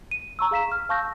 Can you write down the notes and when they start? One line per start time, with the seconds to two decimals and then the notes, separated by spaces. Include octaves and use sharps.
0.11 D#7
0.39 A#5 C#6 E6
0.51 G#4 F5 B6 E7
0.72 F6
0.89 F5 A5 C#6 E6 G6 A#6